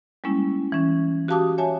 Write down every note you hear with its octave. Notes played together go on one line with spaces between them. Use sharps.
G3 G#3 A#3 C#4 E4
E3 C#4
F#4 G4 F5 A5 D6 D#6
C#5 E5 G#5 A5